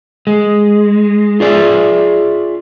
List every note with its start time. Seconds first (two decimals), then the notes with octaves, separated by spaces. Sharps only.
0.27 G#3
1.40 F4 G#4 D5 E5